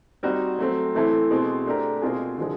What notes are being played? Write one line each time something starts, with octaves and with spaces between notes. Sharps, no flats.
G3 C4 D#4 F#4
F#3 A3 C4
E3 A3 C4 E4 A4
B2 G#3 C4
A3 D4 G4 A#4
B2 G#3 C4 F4 G#4
D3 F3 G#3